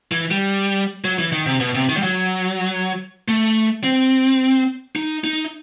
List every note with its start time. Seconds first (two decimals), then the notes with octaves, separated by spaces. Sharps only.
0.12 E3
0.31 G3
1.04 F#3
1.19 E3
1.32 D#3
1.46 C3
1.60 B2
1.75 C3
1.89 D#3
1.97 G3
2.03 F#3
3.28 A3
3.84 C4
4.96 D#4
5.24 D#4